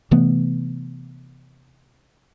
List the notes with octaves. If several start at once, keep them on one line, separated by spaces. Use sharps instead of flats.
C3 E3 A3 B3